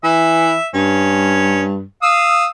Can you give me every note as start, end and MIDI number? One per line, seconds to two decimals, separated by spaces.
0.04 0.55 52
0.04 0.66 76
0.74 1.83 43
0.74 1.63 61
2.02 2.46 77
2.02 2.46 87
2.02 2.46 88